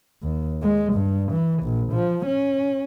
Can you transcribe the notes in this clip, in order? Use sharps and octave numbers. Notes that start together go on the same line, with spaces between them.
D#2
G#3
G2
E3
A#1
F3
C#4